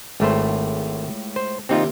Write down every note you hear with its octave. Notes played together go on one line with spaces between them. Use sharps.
G#1 C#2 A2 A3 C5
C5
D#2 C3 C4 D#4 F4